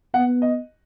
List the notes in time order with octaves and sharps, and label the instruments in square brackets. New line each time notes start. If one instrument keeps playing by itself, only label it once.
[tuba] B3 [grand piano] F#5
[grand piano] D#5